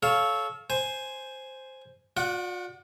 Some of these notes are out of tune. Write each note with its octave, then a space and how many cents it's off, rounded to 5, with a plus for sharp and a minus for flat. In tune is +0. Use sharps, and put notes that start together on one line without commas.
A4 -20 C#5 +0 F5 +0
C5 +0 G#5 +0
F4 +45 D5 +0 F#5 +0